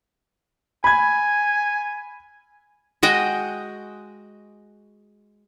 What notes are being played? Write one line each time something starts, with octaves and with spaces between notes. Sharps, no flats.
G#5 B5 G#6
G#3 F#4 D#5 G5